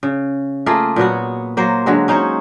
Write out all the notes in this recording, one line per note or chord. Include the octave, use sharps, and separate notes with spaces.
C#3
A3 A#3 F4 G#4
A#2 F#3 B3 F#4
F#3 A#3 C5
D3 F#3 G#3
C#4 D#4 C5 C#5